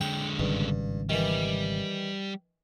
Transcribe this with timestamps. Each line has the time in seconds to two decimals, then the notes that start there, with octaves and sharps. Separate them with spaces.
0.01 D3 G#3 G5
0.39 G#1 G2 C#3
1.09 D#3 E3 G3